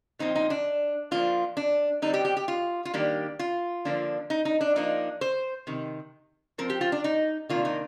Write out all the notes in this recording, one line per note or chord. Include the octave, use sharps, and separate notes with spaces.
A#2 F3 C4 D#4
D#4
D4
F3 A#3 D4 F4
D4
D3 G3 C4 D#4
G4
G4
G4
F4
F4
D#3 G3 A#3 D4 G4
F4
D3 F3 A#3 D4
D#4
D#4
D4
F3 A#3 D4 D#4
C5
C3 D#3
F3 C4 A#4
G4
F4
D4
D#4
C3 D#3 A#3 D4 F4
D#4